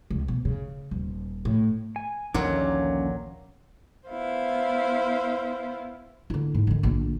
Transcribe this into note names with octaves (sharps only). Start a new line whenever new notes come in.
C#2
B2
C#3
D#1
A2
G#5
A#1 D#2 A#2 D3 F#3 C#4 D6
B3 E4 C5 F5
D3 E4
G#2
D3 D#3
A#1 D3